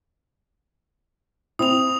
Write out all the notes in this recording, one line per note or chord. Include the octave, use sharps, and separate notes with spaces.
C4 E4 D#6 F7